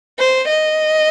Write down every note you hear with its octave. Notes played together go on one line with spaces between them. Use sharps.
C5
D#5